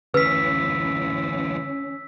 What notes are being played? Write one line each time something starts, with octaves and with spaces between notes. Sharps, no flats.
D2 E3 C#4 B4 E6 B6